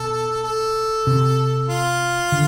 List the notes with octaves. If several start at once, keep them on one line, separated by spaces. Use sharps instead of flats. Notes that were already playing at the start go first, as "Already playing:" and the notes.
Already playing: B2 A4
A4
C3
F4
D3